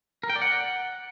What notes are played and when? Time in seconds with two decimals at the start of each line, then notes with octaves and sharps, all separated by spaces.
0.23 A#4
0.30 G5
0.36 D5
0.42 F#5